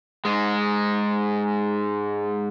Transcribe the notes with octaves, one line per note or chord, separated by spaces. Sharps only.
G#2 G#3